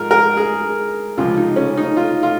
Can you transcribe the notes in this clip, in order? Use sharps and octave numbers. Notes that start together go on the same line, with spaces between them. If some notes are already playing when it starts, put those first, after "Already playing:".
Already playing: G#2 F3 G#3 A#4
A#4
G#4
C#2 C3 F3 G#3 F4
D#4
C#4
D#4
F4
F4